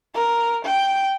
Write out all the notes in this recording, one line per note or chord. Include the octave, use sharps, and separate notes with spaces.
A#4
G5